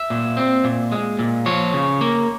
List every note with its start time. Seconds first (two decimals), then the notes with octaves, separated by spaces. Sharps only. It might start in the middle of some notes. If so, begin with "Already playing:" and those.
Already playing: E5
0.10 A#2
0.37 C4
0.64 A#2
0.92 G#3
1.19 A#2
1.46 F3 C#5
1.73 C#3
2.01 A#3